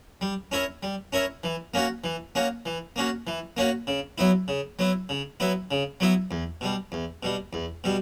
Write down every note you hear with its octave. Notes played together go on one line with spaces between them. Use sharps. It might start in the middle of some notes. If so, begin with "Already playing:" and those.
G3
C#4 E4 A#4 C#5
G3
C#4 E4 A#4 C#5
E3
A#3 C#4 F#4
E3
A#3 C#4 F#4
E3
A#3 C#4 F#4
E3
A#3 C#4 F#4
C#3
F#3 B3 E4
C#3
F#3 B3 E4
C#3
F#3 B3 E4
C#3
F#3 B3 E4
E2
B2 G3
E2
B2 G3
E2
B2 G3